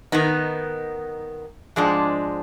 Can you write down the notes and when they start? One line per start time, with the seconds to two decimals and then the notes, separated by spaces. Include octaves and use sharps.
0.12 D#3 B3 D#4
1.76 G#2 F3 G#3 D4